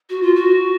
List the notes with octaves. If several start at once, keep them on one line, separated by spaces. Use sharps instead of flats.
F#4
F4
F#4